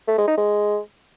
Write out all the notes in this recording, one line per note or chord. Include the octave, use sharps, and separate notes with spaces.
A3
G#3
D#4
G#3